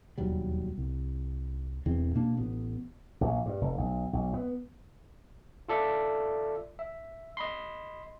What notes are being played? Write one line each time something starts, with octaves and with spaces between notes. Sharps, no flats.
E1 D#2 F#3 G3
C2
E1 E2 E3 C4
B2 A#3 D4
A1 B3
A#1
G2
F1
B1
B1
B3
F4 A4 D5 E5
E5
D#5 B5 C6